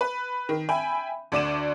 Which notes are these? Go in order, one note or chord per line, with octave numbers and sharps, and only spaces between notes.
B4
D#3
E5 G5 G#5 B5
D2 D3 D4 D5 D#7 E7